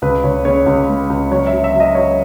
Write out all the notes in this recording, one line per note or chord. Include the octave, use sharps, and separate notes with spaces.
C#2 B4
C#2 C#5
C#3 C#5
C#2
G#3
C#2
F#3 C#5
E5
F#3
E5
F#3
D#5
F#3 C#5